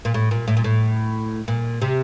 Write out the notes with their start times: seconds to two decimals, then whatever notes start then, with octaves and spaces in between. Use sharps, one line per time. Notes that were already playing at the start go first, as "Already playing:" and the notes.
0.05 A#2
0.14 A2
0.31 A#2
0.47 A2
0.57 A#2
0.64 A2
1.48 A#2
1.82 C3